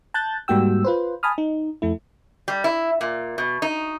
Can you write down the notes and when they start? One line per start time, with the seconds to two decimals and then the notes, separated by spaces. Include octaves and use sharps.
0.14 A5 F#6 G6 A6
0.48 G#2 G3 A#3 F#4 G5 E6
0.85 F4 B4 C5
1.23 G#5 A5 B5 D#6 F6
1.38 D#4
1.82 F2 A3 E4
2.48 G3
2.64 E4
3.01 A#2
3.38 B2
3.62 D#4